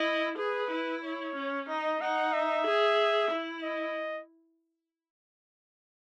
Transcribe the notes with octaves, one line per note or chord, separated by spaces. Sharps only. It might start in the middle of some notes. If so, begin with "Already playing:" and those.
Already playing: E4 D#5
G#4 B4
E4
C#5
C#4
D#4 D#5
D#4 F#5
E5
G#4
E4
D#5